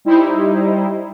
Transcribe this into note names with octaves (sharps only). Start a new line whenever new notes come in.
G3 D#4 E4 C5